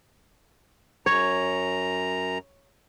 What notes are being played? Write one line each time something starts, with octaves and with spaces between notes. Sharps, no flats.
F#2 C#5 A#5